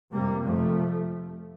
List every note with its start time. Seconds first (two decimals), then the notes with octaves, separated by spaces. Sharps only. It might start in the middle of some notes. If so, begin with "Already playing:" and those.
0.13 F2 C3 G3 A#3
0.46 F2 C3 F3 A3